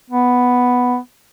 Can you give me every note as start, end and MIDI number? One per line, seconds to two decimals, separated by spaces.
0.10 0.97 59